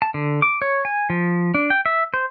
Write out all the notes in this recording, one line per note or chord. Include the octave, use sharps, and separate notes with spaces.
A5
D3
D6
C#5
G#5
F3
D4
G5
E5
C5